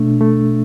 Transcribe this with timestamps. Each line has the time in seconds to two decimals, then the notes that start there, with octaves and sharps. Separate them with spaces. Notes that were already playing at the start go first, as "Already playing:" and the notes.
Already playing: B2 A3 D4
0.21 A3